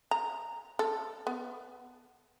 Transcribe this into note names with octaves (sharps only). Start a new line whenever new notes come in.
A#5
A4
B3